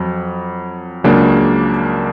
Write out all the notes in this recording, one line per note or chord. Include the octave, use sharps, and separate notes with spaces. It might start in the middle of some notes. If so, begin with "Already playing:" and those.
Already playing: F2 F#3
C#2 C#3 F#3 A#3 D4